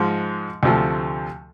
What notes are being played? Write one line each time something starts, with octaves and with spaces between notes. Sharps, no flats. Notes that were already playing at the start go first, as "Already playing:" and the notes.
Already playing: G#2 F3 G#3
D2 C3 F3 A3